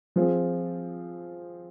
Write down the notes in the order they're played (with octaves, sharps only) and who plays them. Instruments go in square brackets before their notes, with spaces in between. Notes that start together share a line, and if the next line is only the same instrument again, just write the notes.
[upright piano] F3 C4 F4 G#4